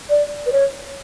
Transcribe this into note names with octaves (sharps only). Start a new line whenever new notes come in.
D5
B4
C#5